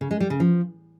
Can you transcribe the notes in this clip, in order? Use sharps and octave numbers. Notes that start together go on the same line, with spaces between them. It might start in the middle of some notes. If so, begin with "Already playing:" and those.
C#3
G#3
G3
C#3
F3